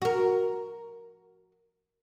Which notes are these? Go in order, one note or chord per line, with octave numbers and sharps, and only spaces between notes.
F#4 A#4